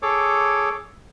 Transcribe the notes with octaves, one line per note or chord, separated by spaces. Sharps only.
G#4 A4 C#5 D6